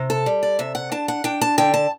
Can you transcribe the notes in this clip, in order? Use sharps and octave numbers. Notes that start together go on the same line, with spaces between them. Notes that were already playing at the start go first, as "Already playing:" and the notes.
Already playing: C3
A4
G3
D5
C3 E5
F#5
D4 A5
F#5
D4 G5
A5
D3 G5
A5